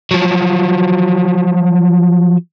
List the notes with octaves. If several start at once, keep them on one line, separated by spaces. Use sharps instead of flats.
F3 F#3